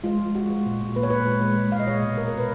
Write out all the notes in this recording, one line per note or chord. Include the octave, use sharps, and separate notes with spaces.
G#3 F4
G#3
G#3 F#4
G#3
A#2
A#2
A#3 B4
C#5
A#2 B4
G#3
G#3
G#3
A#2 F5
D#5
G#3 C#5
B2
B2 A#4
A#4
B2
B4